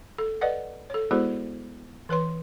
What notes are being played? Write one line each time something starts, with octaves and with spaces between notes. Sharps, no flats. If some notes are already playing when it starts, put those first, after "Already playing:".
A4
B4 D5 D#5 F#5
A4 C#5
G#3 B3 E4 F#4 G#4 C5
E3 B4 C#5 C6